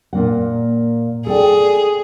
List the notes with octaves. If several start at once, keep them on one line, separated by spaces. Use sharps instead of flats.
A#2 A#3 F#5
G#4 A4 D5 G5